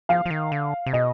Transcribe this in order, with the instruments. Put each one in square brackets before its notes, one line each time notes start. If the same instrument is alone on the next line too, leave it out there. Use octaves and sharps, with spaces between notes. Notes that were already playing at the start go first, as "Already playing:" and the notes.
[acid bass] F3 [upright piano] F5
[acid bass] F3
D#3
D3
C3
[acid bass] B2 [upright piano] D#5